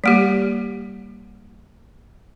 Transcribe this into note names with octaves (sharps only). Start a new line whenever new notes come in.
G3 A#3 G4